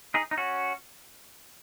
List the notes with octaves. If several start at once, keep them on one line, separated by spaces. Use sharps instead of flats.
D#4 G#4
D#4
C#4 F#4